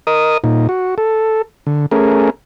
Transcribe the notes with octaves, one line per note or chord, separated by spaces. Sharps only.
A#4 D#5 D#6
A#2 D#4
F#4
A4
D3
A3 C#4 G#4 A#4